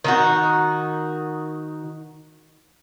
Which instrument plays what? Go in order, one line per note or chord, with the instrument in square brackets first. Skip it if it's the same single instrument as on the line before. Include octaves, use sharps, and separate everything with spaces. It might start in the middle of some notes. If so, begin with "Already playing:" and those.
[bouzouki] D#3 D#4 F#4